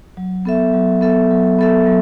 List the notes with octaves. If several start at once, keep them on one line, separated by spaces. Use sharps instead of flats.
F#3
B3 A4 E5
F#3
B3 A4 E5
F#3
B3 A4 E5
F#3